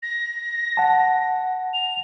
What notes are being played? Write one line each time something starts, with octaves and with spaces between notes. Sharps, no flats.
A#6
F#5 A5
F7